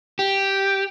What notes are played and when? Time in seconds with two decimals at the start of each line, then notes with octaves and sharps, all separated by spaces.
0.19 G4